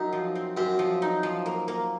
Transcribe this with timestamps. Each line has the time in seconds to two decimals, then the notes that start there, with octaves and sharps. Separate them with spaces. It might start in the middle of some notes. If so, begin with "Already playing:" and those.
Already playing: F#2 D#4
0.13 F3
0.35 C4
0.57 F#2 C4
0.79 F3
1.02 D#4
1.23 F3
1.46 A#3
1.68 A#3